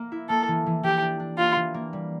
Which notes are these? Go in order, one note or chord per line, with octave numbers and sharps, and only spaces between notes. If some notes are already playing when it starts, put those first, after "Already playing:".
Already playing: A#3
E4
A#3 A4
E3
E3
E3 G4
D4
D4
A#3 F4
E3
A#3
G3